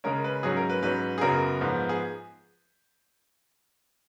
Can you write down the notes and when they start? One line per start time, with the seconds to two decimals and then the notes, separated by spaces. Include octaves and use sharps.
0.04 C#3 G#3 C#4 A#4
0.24 B4
0.43 G#2 F#3 C#4 G#4
0.57 A#4
0.70 B4
0.83 G#2 F#3 C#4 B4
1.18 G#4
1.21 F#2 C#3 F#3 B3 A#4
1.61 G#2 F3 B3
1.89 G#4